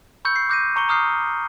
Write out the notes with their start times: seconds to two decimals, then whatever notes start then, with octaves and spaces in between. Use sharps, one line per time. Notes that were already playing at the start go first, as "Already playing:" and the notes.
0.25 B5 C#6 E6 G6 C#7
0.36 C7
0.49 D6 F#6 G6 A#6 C7 D#7
0.76 A#5 C#6 C#7 G7
0.88 A#5 D#6 F6 G6 C7
1.08 C#6